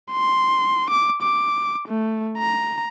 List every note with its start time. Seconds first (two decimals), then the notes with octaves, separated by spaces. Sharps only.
0.12 C6
0.90 D6
1.22 D6
1.88 A3
2.38 A#5